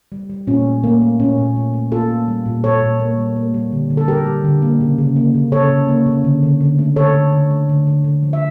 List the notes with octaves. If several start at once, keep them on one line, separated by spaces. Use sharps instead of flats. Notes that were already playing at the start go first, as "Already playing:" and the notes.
G3
G3
A#2 C#4
A3
A3 A#3
A3
A#2 C#4
A#2
A3
A3
A#3 F4 A4
A#3
G3
A#2
A#2 A4 C#5
A#2
A#3
G3
A#3
G3
D3
D3
A4
G3 G4 A#4
G3
D3
A#3
C#3
C#3
A#3
C#3
C#3 A4 C#5
C#3
A#3
C#3
D3
D3
D3
A3
D3 A4 C#5
D3
D3
A3
D3
D3
D3
F3
E5